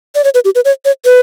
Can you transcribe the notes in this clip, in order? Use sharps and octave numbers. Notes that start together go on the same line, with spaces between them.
D5
C#5
B4
G4
B4
C#5
C#5
B4